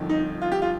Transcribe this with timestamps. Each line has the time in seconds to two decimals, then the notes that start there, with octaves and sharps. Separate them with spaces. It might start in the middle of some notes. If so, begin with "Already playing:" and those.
Already playing: G1 F2 D#3
0.09 D#4
0.42 F4
0.52 G4
0.62 F4